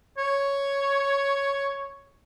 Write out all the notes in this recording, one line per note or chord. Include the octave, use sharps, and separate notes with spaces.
C#5